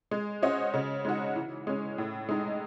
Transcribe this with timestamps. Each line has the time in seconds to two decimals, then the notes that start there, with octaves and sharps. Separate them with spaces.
0.11 G#3
0.42 C#4 F#4 C5 D#5
0.74 C#3
1.05 G#3 D#4 F#4
1.36 E3
1.67 G#3 C#4
1.98 A2
2.29 G#3 D#4